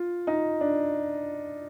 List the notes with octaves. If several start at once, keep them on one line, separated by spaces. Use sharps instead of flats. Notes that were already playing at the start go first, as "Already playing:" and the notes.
Already playing: F4
D#4
D4